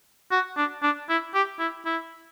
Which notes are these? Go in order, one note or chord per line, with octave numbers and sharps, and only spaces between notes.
F#4
D4
D4
E4
G4
E4
E4